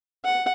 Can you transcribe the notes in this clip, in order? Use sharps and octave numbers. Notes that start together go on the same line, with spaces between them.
F#5